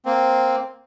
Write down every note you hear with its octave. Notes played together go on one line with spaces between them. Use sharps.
A#3 C4